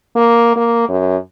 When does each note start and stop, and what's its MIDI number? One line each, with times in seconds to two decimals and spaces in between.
0.15 0.53 58
0.56 0.88 58
0.88 1.17 42